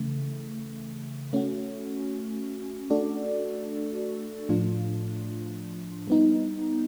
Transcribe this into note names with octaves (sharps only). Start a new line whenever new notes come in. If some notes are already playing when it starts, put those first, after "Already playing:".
Already playing: C#3 E3 A3
A3 C#4 F#4
A3 D4 F#4 A4 D5
A2 F3 A3 D4 F4
G3 B3 D#4